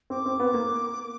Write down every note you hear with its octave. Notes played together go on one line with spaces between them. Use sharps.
C4 D6
C4
B3
A#3